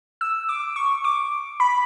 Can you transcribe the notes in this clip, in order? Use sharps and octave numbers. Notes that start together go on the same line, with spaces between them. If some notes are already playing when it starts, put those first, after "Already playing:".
E6
D6
C#6
D6
B5